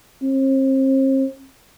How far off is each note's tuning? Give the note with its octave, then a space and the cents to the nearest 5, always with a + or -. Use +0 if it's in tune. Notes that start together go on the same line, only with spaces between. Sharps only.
C4 +40